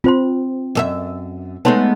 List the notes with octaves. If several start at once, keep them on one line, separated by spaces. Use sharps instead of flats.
C4 F4 C5 C6
F#2 A4 E5
G#3 A3 B3 D#4 C#5 C6